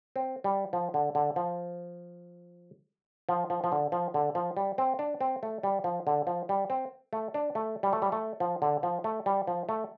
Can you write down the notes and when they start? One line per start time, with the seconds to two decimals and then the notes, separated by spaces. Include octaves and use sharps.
0.16 C4
0.44 G3
0.73 F3
0.94 D3
1.15 D3
1.36 F3
3.29 F3
3.50 F3
3.64 F3
3.72 D3
3.92 F3
4.14 D3
4.35 F3
4.57 G3
4.78 C4
4.99 D4
5.21 C4
5.43 A3
5.63 G3
5.84 F3
6.07 D3
6.27 F3
6.49 G3
6.70 C4
7.13 A3
7.34 D4
7.55 A3
7.83 G3
7.93 A3
8.02 G3
8.12 A3
8.40 F3
8.62 D3
8.83 F3
9.04 A3
9.26 G3
9.47 F3
9.69 A3